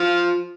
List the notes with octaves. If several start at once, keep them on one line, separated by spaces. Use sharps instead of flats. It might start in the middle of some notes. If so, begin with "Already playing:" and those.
Already playing: F3 F4